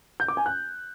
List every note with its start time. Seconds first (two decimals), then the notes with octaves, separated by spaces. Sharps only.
0.20 G6
0.28 D6
0.37 G#5
0.46 F#6